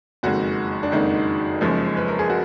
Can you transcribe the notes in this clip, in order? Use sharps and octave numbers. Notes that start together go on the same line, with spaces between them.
F#1 F2 D#3 G#3 F#4
D4
F#1 F2 D#3 G#3 D#4
F#1 F#2 F3 G#3
B4
A#4
G#4
F#4